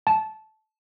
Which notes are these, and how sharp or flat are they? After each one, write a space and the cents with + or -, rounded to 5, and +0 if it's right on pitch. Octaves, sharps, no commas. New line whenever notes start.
A5 -15